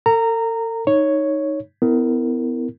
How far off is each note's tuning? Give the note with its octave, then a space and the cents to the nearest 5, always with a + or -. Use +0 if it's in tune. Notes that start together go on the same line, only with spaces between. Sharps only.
A4 +45 A#5 -15
D#4 +0 C#5 +0
B3 +30 E4 -10 A#4 -20